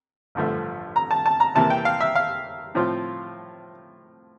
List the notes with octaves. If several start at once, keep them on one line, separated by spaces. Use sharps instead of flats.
A1 G2 D3 F3 A3
A#5
A5
A5
A#5
C3 E3 A#3 A5
G5
F5
E5
F5
A2 F3 C4 F4